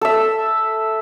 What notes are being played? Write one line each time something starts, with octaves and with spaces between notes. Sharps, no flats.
A4 E5